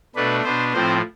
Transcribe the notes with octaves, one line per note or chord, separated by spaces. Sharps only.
B2 A3 D4 B4
B2 B3 D4 C5
A2 F3 C4 C5